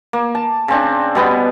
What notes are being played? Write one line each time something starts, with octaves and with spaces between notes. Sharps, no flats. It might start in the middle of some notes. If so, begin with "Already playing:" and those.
A#3
A5
C#3 C4 D4
B2 G3 B3